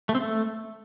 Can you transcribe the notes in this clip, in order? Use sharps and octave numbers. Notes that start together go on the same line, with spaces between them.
A3
C4
A3